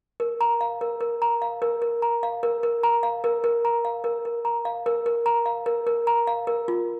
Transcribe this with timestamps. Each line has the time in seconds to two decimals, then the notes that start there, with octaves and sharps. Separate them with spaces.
0.20 A#4
0.41 A#5
0.61 F5
0.81 A#4
1.01 A#4
1.22 A#5
1.42 F5
1.62 A#4
1.82 A#4
2.02 A#5
2.23 F5
2.43 A#4
2.63 A#4
2.83 A#5
3.03 F5
3.24 A#4
3.44 A#4
3.65 A#5
3.85 F5
4.04 A#4
4.25 A#4
4.45 A#5
4.65 F5
4.86 A#4
5.06 A#4
5.26 A#5
5.46 F5
5.66 A#4
5.87 A#4
6.07 A#5
6.27 F5
6.47 A#4
6.68 F4